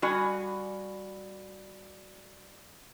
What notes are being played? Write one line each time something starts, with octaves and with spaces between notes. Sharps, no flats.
G3 F#4 G#5